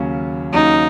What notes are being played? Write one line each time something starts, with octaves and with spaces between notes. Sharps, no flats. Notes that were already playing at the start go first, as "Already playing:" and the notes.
Already playing: D#2 C#3 F#3 C#4
D#2 C#3 F#3 C#4 D#4